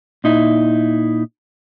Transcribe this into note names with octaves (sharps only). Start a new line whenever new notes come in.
A#2 D#4 E4